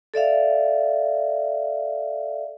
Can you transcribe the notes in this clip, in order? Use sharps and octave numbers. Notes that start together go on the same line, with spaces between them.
A4 D5 E5 F5